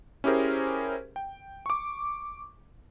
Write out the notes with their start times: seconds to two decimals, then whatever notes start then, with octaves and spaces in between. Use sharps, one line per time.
0.24 C#4 E4 G4 G#4 A#4 C5
1.16 G5
1.66 C#6 D6